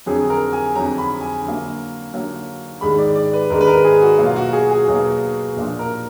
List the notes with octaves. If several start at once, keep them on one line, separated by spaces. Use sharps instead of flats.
F2 D3 F#3 G#4
A#4
G#5
F2 D3 F#3 A#5
B5
G#5
D3 F#3 A#3
D3 F#3 A#3
G#2 D#3 G#3 D4 B5
D5
D5
B4
G#2 D#3 G#3 D4 A#4
B4
A#4
G#4
F#4
B2 F#3 A#3
F4
F#4
G#4
G#4
B2 F#3 A#3
A#2 F3 A#3 D4
A#4